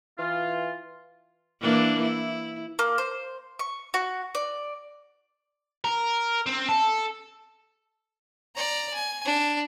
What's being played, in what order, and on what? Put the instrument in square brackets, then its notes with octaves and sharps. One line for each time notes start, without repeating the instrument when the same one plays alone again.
[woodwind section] E3 F4
[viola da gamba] E3 A#3 D4
E4
[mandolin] A#3
C5
C#6
F#4
D5
[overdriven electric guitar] A#4
C4
A4
[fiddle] D5 A#5
G#5
D4